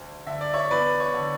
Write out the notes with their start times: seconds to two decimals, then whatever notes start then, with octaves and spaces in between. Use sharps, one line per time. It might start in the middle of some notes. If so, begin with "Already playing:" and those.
Already playing: D2
0.27 D3 E5
0.41 D5
0.53 C#5 E5
0.70 E2 B4 D5
1.00 C#5
1.14 D3